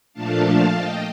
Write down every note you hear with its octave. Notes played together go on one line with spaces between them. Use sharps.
A#2 F3 A3 D4 F5 A5
F5 A5
D#5 G5